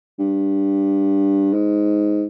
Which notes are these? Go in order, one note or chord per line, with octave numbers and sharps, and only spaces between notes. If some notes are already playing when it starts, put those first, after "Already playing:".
G2
G#2